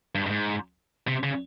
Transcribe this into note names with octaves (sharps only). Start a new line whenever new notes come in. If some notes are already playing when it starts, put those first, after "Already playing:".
G2
G2
G#2
C3
C#3